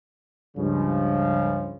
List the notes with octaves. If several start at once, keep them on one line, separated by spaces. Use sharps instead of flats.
C#2 G2 C#3 F3